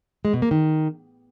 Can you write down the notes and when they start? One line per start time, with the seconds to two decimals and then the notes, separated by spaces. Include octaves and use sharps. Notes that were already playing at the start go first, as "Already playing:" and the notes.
0.25 G#3
0.33 B2
0.42 A#3
0.51 D#3